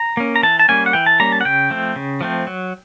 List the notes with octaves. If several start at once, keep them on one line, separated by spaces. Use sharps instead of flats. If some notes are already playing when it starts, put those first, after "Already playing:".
Already playing: A#5
A#3 C#4
A#5
E3 A5
A5
G3 A#3 C#4 G#5
F#5
E3 G5
A5
G3 A#3 C#4 A#5
A5
F#5
C#3 G5
F3 A3 C4
C#3
F3 A3 C4
F#3